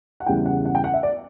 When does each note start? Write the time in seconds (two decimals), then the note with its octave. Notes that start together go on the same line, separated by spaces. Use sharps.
0.20 F#5
0.26 E2 C#3 G3 C#4 E4 G5
0.46 F#5
0.65 F#5
0.75 G5
0.84 F#5
0.94 E5
1.03 D5